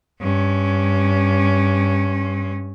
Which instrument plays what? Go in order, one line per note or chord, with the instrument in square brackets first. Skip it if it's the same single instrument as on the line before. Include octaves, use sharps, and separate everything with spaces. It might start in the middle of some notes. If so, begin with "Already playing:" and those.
[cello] G2 C#4